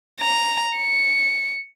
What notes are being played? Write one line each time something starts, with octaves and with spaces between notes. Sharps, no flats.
A#5
C#7